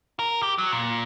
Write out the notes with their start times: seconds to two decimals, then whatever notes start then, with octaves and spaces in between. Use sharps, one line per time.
0.19 A#4
0.42 G4
0.58 F#3
0.72 A#2